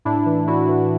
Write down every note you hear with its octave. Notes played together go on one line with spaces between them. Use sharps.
A2 D4 E4
E3
A2 E4 F#4
E3